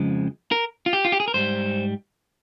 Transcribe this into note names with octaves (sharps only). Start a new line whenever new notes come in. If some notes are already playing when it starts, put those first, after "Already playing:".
Already playing: F2 C#3 F3 G#3
A#4
F4
G4
F4
G4
G#4
A#4
G#2 G3 C5